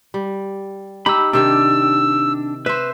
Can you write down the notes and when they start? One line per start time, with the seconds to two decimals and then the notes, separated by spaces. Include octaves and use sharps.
0.14 G3
1.06 D#4 G4 B5 E6
1.33 C3 D#3 D4 G4 E6
2.66 B4 C5 E5